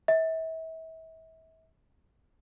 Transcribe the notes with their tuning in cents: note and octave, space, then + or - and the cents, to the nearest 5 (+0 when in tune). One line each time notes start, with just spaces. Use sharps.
E5 -35